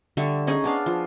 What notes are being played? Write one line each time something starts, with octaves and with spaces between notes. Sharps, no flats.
D3 G3 E5 C#6
C#4 D#4 G#4
B3 D4 F5
F3